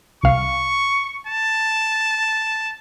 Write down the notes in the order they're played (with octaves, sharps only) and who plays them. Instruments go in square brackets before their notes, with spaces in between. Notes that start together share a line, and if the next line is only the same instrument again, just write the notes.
[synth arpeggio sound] C2 F5 [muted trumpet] C#6
[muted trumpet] A5